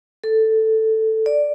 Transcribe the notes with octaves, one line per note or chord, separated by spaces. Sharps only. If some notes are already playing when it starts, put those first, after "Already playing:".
A4
D5